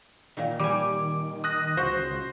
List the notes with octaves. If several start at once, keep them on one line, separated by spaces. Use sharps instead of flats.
A#2 D#3
D#3 G3 G#5 D6
D#6 F#6 A#6
C#2 F#4 C5